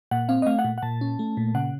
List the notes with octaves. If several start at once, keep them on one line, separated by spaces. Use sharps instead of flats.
A#2 F#5
C4 F5
D#5
A3 F5
F#5
A#2
F#5
A#2 A5
C#4
A3
A#2
C#3 F#5